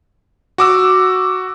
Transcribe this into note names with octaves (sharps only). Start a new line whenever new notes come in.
F#4 D6 E6